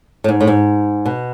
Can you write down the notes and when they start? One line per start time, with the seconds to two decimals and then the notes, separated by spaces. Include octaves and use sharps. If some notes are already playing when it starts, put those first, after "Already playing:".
0.24 A2
0.28 G#2
0.41 A2
0.47 G#2
1.05 B2